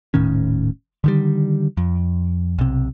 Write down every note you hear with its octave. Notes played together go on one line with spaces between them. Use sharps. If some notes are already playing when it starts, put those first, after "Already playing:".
D#1 A2 D#3 C#4
D3 D#3 G3
F2
B1 C3